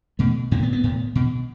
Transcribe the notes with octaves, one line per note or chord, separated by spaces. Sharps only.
B2 A3
A2 A#3
B3
B3
A2
B2